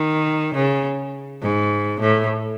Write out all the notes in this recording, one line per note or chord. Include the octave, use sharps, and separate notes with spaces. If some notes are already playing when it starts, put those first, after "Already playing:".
Already playing: D#3
C#3
G#2
A2